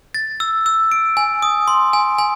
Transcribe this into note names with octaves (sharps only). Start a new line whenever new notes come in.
A6
E6
E6
D7
G#5
D#6
C6
G#5
G#5